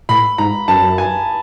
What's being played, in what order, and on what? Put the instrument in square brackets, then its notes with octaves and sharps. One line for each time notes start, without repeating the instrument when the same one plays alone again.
[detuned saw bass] A2 [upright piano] B5
[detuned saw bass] G#2 [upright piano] A#5
[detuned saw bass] F#2 [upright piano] A5
[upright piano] G#5